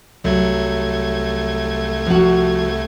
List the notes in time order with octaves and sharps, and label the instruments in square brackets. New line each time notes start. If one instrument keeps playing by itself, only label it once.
[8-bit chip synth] C2 A3 G#6 [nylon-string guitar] F#3
[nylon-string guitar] F3 F#4